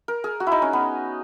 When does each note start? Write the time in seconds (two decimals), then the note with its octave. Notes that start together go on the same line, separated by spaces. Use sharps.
0.08 A#4
0.24 G#4
0.40 F#4
0.47 E4
0.52 D#4
0.62 C#4
0.73 B3